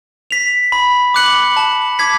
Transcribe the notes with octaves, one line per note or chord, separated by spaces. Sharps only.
B6 F7
B5
D6 F#6 C#7 F#7
A5
D6 G#6 B6